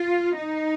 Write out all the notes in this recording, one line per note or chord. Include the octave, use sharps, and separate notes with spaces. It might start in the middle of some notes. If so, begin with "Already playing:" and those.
Already playing: F4
D#4